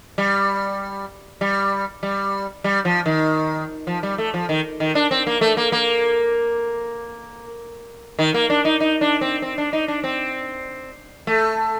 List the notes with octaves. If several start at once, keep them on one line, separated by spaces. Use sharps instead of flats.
G3
G3
G3
G3
F3
D#3
F3
G3
A3
F3
D#3
D#3
D4
C4
A#3
A3
A#3
A#3
D#3
A#3
D4
D#4
D#4
D4
C4
C4
D4
D#4
D4
C4
A3